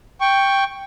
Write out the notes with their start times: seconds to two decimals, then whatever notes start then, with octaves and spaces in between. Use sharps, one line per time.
0.21 G5 C#6